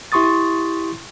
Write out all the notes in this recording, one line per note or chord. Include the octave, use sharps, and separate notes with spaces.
E4 G4 C6 C#6 D#6 A6